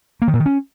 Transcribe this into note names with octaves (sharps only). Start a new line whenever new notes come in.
A#3
D#3
A#2
D#3
C#4